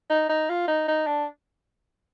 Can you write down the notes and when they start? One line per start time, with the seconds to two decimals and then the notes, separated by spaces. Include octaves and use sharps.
0.10 D#4
0.29 D#4
0.49 F4
0.68 D#4
0.88 D#4
1.07 D4